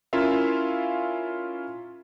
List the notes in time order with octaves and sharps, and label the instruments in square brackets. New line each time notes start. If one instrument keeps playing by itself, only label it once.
[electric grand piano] C#4 E4 F4 A#4 E5 F5